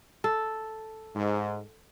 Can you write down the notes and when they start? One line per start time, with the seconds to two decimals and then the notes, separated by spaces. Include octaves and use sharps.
0.24 A4
1.15 G#2